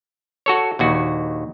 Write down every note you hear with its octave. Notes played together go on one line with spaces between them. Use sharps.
F#4 A4 C#5
A#1 D#2 F#4